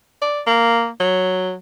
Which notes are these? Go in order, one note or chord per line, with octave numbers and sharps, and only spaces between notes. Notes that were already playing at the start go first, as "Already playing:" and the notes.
D5
A#3
F#3